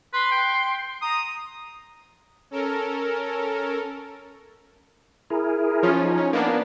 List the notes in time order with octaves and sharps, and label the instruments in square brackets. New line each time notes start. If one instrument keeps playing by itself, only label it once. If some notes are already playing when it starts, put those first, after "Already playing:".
[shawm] B4 [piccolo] C6
[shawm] G5
[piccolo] A#5 [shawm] D#6
[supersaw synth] C#4 A4 A#4
[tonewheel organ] E4 G#4 A#4
[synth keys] F3 C#4 F4
[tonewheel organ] D#4
[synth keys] C#4
A#3 B3 D4